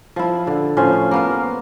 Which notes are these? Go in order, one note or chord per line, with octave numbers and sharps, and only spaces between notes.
F3 E4
D3
A2 F3 C#4 C5
F5
A#3 B3 F5